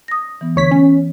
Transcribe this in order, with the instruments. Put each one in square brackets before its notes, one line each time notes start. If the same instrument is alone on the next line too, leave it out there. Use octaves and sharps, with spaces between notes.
[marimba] D#6 A#6
E3 B3
[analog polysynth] D2 C#5 B6
C#4